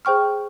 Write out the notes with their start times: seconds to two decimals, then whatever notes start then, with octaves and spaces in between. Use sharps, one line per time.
0.05 G#4 C5 G5 C#6 F6